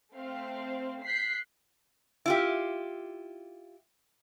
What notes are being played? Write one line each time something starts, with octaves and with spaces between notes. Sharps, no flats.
A3 C4 F5
F#6 G6 B6 C7
E4 F4 G4